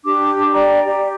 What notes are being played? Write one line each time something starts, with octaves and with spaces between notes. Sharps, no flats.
D4 G4 D6
D5 G5 A#5
G4